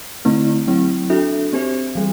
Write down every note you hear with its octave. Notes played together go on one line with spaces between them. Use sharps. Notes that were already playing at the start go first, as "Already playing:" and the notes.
D3 A3 C4 E4
F#3 C4 E4
D4 F#4 A4 E5
C4 G4 C5 E5
E3 G3